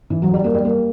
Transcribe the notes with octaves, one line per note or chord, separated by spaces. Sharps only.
E3
F#3
G3
A#3
G3
A#3